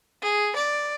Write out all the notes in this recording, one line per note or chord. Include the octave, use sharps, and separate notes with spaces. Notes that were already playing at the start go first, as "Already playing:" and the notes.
G#4
D5